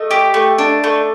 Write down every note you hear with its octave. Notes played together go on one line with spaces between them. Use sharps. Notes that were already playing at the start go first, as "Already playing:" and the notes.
Already playing: A3 D#5
G4
A3
D4
A3